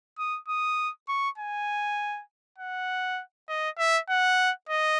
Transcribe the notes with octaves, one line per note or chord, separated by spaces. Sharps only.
D#6
D#6
C#6
G#5
F#5
D#5
E5
F#5
D#5